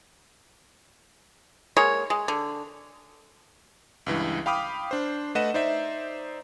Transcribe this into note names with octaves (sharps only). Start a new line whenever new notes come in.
G#3 A#3 C#5
G#3
D3
C#2 G2 E3
F5 G5 B5 D6 D#6 F6
D4 C5
A3 B4 D#5 F#5 E7
D#4 C5 D5 E5